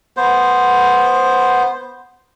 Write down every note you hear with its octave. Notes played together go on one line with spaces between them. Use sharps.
B3 C5